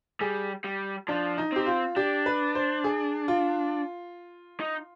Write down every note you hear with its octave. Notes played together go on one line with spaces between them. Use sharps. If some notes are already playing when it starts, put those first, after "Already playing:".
G3 G#4
G3
F3 D4
D#4
C4 G4
F4
D4 G4
B4
C5
G#4
F4
D#4